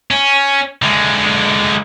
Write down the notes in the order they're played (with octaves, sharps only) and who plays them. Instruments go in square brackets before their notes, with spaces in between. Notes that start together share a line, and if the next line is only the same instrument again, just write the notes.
[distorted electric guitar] C#4
D3 G#3